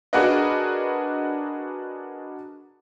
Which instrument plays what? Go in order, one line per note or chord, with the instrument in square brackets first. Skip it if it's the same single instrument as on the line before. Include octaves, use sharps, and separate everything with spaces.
[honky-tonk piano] D4 F#4 G#4 A#4 B4 D#5